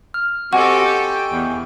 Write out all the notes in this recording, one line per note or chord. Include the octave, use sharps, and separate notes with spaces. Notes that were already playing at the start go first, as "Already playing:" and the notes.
F6
C4 F#4 G4 A4 D#5 F#5 G#5 C#6
G5
E2